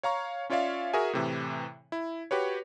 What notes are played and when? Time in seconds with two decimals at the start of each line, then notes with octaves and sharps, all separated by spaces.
0.03 C#5 F5 A#5 C#6
0.50 C#4 F4 C#5 D5 E5 F5
0.93 F#4 G#4 A#4 E5 G#5
1.13 A2 C3 E3
1.92 E4
2.31 F#4 G4 B4 C#5